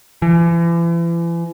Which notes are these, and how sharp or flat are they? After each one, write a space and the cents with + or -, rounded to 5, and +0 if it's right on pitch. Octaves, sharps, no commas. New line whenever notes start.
E3 +40